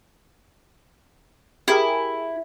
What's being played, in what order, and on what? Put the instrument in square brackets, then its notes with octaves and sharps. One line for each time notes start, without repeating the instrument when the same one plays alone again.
[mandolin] E4 [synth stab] G4 G#4 A#4